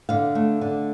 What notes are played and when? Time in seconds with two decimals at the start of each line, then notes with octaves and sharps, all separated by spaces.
0.09 D3 F5
0.35 A3
0.61 D3